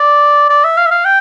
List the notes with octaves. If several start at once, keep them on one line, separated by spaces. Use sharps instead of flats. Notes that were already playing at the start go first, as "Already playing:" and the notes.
Already playing: D5
D5
E5
F5
E5
F5
G5